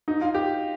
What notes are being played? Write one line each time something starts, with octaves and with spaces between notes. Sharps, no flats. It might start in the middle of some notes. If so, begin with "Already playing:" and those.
D#4
F4
G4